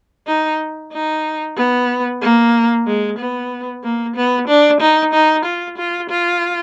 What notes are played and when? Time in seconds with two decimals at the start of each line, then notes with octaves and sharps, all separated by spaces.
0.27 D#4
0.92 D#4
1.57 B3
2.22 A#3
2.86 G#3
3.19 B3
3.83 A#3
4.16 B3
4.48 D4
4.80 D#4
5.13 D#4
5.45 F4
5.78 F4
6.10 F4